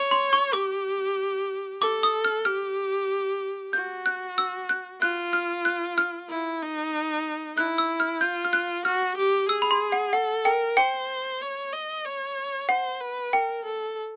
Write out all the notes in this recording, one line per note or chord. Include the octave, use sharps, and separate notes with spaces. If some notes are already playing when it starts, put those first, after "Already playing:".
Already playing: C#5
C6
C#6
G4 D6
A4 D6
D#6
F6
G4 F6
F#4 G6
F#6
E6
F#6
F4 F#6
F6
F#6
F6
E4
D#4
E4 F#6
E6
F6
F4 G6
F6
F#6
F#4 F6
G4
G#4 E6
B5
C6
F#5
A4 F#5
A#4 G5
C5 G5
C#5
D#5
C#5
C5 F#5
B4
A#4 G5
A4